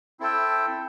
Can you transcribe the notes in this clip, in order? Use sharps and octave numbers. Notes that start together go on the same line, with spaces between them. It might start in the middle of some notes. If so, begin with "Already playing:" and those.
C4 E4 A4 E5 G5